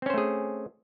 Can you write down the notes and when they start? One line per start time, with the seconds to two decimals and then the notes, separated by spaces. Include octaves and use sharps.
0.02 C4
0.06 C#4
0.10 C5
0.14 A3
0.18 G#4